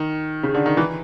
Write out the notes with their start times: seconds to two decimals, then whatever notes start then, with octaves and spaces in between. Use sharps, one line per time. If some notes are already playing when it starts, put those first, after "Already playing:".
Already playing: D#3
0.43 C#3
0.54 D3
0.66 D#3
0.77 E3